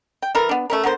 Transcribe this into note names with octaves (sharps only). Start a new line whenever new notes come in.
G5
E3 A4 A#4
B3 D4
A3 C#4 A#4
D3 B3 A#4 C5